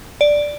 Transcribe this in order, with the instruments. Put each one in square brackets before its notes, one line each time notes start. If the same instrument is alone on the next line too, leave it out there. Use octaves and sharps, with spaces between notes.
[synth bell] D5